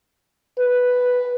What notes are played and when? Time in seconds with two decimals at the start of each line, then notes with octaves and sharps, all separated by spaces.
0.59 B4